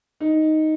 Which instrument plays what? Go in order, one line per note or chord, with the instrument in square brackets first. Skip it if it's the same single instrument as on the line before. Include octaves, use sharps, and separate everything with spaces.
[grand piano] D#4